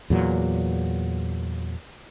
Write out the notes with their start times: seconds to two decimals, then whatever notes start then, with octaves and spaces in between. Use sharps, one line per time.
0.10 E2 A#2 F#3